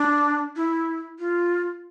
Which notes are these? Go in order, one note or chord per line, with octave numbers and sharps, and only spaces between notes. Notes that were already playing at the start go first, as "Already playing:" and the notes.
Already playing: D4
E4
F4